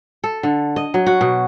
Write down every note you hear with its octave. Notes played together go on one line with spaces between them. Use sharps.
A4
D3
D#5
F#3
F#4
B2